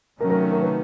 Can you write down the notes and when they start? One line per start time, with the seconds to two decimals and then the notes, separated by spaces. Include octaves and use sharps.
0.20 C3 D#3 F#3 A3 C#4 A#4
0.30 A#4
0.41 A#4
0.51 A#4
0.62 B4